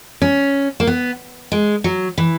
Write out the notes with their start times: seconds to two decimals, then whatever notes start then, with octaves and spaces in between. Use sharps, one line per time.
0.22 C#4
0.80 A#3
0.87 B3
1.52 G#3
1.84 F#3
2.18 E3